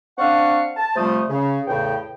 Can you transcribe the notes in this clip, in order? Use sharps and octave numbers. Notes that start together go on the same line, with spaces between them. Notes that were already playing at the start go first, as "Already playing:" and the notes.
C4 D4 D5 F5 F#5 C#6
A5
C3 F3 G3 A3 C5 D#6
C#3
E2 A2 C#3 G5